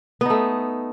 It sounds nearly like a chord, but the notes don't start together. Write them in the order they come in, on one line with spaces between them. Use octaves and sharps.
B3 D#4 A3